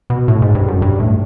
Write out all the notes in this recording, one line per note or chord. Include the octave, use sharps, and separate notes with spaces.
B2
A2
G#2
G2
F#2
G2
A2